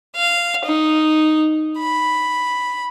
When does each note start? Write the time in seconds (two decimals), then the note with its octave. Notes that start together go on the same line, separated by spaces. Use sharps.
0.16 F5
0.65 D#4
1.79 B5